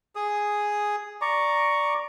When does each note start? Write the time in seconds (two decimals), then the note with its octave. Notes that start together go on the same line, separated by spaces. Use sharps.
0.16 G#4 D#6
1.21 D5 A#5 C#6 D6